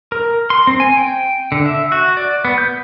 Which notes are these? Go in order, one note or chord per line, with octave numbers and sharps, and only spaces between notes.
A#4
C6
C4
G#5
G5
D3
E5
F#4
D5
B3
G6